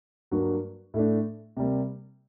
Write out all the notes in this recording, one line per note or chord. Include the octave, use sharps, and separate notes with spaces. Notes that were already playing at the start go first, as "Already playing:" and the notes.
G2 F#3 A#3 F#4 A#4
A2 A3 D4
C3 G3 A#3